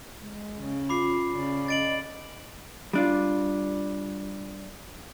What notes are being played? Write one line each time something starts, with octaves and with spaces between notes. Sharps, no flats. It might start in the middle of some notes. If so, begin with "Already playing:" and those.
G#3
C#3
F4 B5 D6 C7
C#3 D5
D#5 A6 D7 F#7
G3 D4 F4